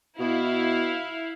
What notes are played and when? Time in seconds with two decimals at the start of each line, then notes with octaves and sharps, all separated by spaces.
0.19 B2 E4 F5